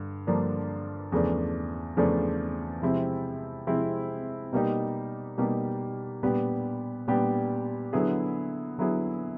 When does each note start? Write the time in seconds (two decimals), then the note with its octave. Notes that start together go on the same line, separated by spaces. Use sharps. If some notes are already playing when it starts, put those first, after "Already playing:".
Already playing: G2 D3
0.27 G2 D3 F3 A#3 D4
1.12 E2 C#3 F3 A3 D4
1.97 E2 C#3 F3 A3 D4
2.82 C3 F3 G#3 C4 E4
3.67 C3 F3 G#3 C4 E4
4.53 B2 G3 A#3 D#4 G4
5.38 B2 G3 A#3 D#4 G4
6.23 A#2 G3 B3 D4 G4
7.08 A#2 G3 B3 D4 G4
7.93 D3 F#3 B3 E4 G#4
8.78 D3 F#3 B3 E4 G#4